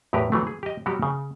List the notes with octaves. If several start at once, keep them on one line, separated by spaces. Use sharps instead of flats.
E2 A2 F#3 G4 A#4 B4
E3 F#3 A3
G#4
G4 D#5
B2 F#3 G3 F#4 G4
C#3